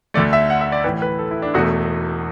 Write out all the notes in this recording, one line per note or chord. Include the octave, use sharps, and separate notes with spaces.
D2 D3 A3 D5
E5
F#5
E5
D5
A1 A2 E3 B4
B4
A4
E4
D4
E1 E2 B2 A3 F#4